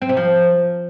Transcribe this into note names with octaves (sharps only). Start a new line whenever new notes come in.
C4
C3
F3